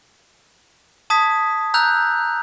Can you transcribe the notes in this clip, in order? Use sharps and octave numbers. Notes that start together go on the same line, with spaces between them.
A5 D#6 G#6 B6
A#5 E6 F#6 G6 F7